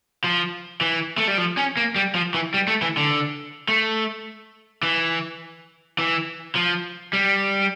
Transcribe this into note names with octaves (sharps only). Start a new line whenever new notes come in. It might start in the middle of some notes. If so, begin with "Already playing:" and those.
F3
E3
A3
G3
F3
C#4
A#3
G3
F3
E3
G3
A3
E3
D3
A3
E3
E3
F3
G3